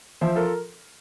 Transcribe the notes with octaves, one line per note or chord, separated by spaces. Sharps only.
F3 C5 E5
F4 A4 A#4